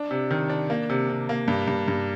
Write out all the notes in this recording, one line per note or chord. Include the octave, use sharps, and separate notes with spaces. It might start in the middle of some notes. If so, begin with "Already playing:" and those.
Already playing: D4
C3
D#3
D4
A#3
C3
C3
A#3
G2
G2
G2